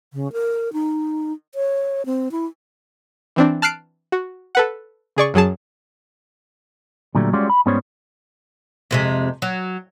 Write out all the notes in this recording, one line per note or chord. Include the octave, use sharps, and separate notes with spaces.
C#3
A#4
D#4
C#5
C4
E4
E3 C4 D4
A5 F6 F#6 C7 D7
F#4
A4 B4 F#5
C#3 G#4 D5 C#6
F#2 F#3 G#4 A5
A#2 D3 F#3 G3 A3
G3 G#3 C#4 F4 F#4 D5
B5
G#2 G3 B3 C#4 C5 C#5
F2 C3 G#3
F#3